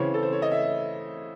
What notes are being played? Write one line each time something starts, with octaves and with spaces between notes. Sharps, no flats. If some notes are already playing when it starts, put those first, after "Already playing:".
Already playing: C#3 E3 C4 C#5
A4
C5
C#5
D#5
E5